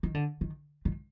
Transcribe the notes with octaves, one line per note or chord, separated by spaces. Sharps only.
D#3
D3
D#3
D#3